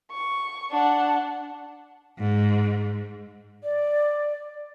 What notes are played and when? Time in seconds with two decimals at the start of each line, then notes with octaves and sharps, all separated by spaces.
0.11 C#6
0.71 D4 F#5
2.19 G#2
3.64 D5